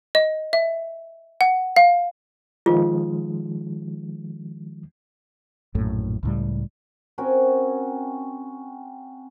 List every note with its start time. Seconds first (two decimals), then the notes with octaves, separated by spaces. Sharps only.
0.15 D#5
0.53 E5
1.41 F#5
1.76 F5
2.66 D#3 F3 G#3 F4
5.75 A#1 F#2 A2
6.23 C#2 A2 G3
7.18 C4 C#4 F#4 A#4